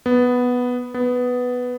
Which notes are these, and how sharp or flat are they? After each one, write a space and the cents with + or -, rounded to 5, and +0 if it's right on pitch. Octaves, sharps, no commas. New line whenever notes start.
B3 +0
B3 +5